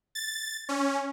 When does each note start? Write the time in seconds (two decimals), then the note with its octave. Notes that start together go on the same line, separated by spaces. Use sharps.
0.15 A6
0.69 C#4